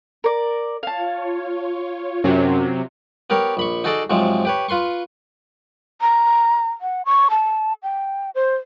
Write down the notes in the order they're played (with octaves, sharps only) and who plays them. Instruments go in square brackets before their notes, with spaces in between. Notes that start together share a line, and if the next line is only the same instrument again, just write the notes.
[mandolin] A#4 D5
[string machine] F4 C#5 [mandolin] F5 A5
[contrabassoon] F#2 [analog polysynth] C3 F#3
[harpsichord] B3 G4 A#4 C#5
A#1 B5 C#6
D#4 F#4 G#4 A4 D5 D#5
G#2 C3 F3 F#3 G#3
G4 B4 C#5
F4 B4 C6 C#6
[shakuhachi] A#5
F#5
C#6
A5
G5
C5